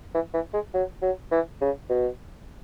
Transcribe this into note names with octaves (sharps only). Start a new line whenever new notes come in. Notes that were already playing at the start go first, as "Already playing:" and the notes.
E3
E3
G#3
F#3
F#3
E3
C#3
B2